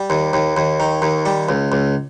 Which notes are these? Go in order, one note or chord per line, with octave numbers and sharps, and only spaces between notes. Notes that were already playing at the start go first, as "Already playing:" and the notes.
Already playing: G3
D#2
D#2
D#2
D#3
D#2
G3
C#2
C#2